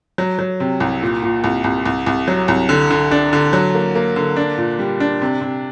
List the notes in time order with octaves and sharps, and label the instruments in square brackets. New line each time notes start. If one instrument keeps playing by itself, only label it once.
[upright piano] F#3
F#3
C3
C2
A#2
A#2
C2
C2
C2
C2
F#3
C2
D3
D3
D4
D3
F#3
A#3
A#3
D3
D4
A#2
G3
D4
C3
C3